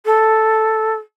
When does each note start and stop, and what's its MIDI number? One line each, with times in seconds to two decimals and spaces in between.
0.05 0.94 69